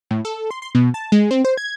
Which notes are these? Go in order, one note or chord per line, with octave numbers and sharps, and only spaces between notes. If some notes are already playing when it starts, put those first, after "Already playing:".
A2
A4
C6
C6
B2
A5
G#3
C4
C5
G#6